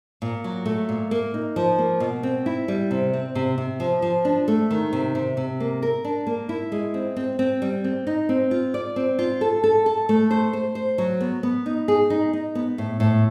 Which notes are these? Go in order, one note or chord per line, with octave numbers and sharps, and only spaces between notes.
A#2
F#3
A3
A#2
A#3
D#4
F3
A#3
B2
C4
E4
G3
C3
C4
C3
C3
F3
F3
D4
A3
D#3
C3
C3
C3
A#3
A#4
D4
A#3
E4
G#3
C4
C4
C4
G3
C4
D#4
C4
F4
D5
C4
F4
A4
A4
A4
A3
C5
C5
C5
F#3
B3
B3
D#4
G#4
D#4
D#4
B3
A2
A2